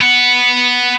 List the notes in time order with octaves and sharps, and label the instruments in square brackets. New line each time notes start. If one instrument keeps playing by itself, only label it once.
[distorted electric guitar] B3 F#5